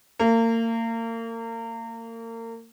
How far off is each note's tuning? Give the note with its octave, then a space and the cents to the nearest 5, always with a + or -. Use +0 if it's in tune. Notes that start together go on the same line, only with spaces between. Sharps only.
A#3 -35